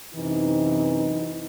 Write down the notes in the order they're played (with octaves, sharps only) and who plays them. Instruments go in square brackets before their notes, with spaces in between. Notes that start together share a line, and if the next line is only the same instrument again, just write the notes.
[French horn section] F#2 C3 E3 D#4